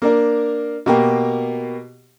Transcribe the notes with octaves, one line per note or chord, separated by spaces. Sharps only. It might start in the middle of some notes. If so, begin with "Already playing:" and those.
A#3 D4 A#4
B2 A#3 G4